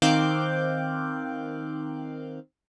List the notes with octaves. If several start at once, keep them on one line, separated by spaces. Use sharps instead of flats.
D#3 C4 F5 D6 F#6 G6